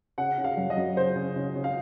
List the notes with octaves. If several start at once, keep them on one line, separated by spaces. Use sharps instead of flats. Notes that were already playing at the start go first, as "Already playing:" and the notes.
C#3 F#5
C#3
F5
F#2
D#5
F#2
C#3 C5
C#3
C#3
C#3
F5